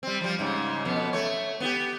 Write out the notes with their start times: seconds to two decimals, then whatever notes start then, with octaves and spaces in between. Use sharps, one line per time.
0.03 G3 C4
0.21 F3 G3
0.39 G#2 C#3 G3
0.85 F2 B2 B3
1.13 A3 C#5
1.60 B3 F4 G4